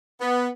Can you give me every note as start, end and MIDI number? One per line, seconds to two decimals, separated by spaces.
0.20 0.48 59